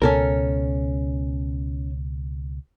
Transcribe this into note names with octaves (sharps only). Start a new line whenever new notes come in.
C#2 B2 C#4 A4 A#4